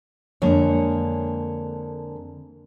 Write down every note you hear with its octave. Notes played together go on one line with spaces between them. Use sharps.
F2 D3 G#3 A#3 C#5